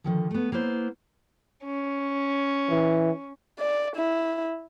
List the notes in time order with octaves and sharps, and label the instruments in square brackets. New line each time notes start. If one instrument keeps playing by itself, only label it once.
[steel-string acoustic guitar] D3 D#3 F3
A3 B3
A#3 B3 E4 C5
[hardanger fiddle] C#4
[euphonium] E3
[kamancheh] D5
E4